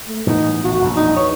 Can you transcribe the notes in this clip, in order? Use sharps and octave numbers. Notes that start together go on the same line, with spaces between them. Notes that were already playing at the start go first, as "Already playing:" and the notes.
A3
A2 E3 B3 D#4
A1 F#4
E1 A#1
D#4
E2 C#5